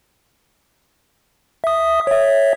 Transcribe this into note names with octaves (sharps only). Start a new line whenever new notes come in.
E5 D#6
C#5 E5